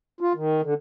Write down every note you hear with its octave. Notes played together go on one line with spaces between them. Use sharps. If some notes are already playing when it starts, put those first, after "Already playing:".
F4
D#3
D3